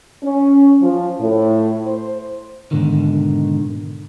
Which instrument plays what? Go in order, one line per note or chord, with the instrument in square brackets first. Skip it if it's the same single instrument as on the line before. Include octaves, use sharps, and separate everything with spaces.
[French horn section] C#4
F3
A2
C5
[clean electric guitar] G#2 B2 D3 D#3